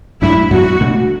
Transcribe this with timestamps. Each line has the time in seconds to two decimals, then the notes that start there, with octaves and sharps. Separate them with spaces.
0.21 F#2 F#3 A3 D4 E4
0.51 F#2 F#3 B3 F#4
0.80 B2 A3 D4